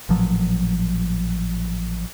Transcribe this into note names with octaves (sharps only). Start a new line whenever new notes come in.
A1 A#2 F3 F#3